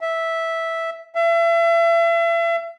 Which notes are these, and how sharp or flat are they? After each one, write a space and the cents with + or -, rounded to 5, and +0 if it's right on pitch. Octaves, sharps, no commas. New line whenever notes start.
E5 -5
E5 +35